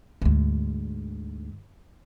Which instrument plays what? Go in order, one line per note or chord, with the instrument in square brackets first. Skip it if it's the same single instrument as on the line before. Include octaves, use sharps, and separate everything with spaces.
[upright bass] D2 G#2